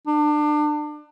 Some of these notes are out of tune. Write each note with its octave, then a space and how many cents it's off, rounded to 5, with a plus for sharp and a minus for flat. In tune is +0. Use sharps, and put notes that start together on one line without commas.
D4 +30